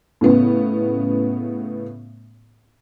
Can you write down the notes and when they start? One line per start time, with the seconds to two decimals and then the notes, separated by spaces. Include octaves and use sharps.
0.21 A2 C#3 B3